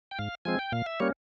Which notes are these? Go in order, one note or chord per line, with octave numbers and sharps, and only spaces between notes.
G5
G#2 F5
F3 G#3 C4 G#5
G5
A#2 F5
E5
G3 A#3 C#4 C#5